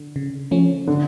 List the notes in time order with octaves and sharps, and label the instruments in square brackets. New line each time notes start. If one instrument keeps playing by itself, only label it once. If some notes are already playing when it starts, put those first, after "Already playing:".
Already playing: [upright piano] D3
[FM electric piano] C#3
F3 A3 C#4
[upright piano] D3